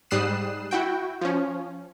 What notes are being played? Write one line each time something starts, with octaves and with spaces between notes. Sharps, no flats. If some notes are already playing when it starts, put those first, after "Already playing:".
G#2 G3 D#6 F#6 C7 E7
E4 F#4 G5
F3 C#4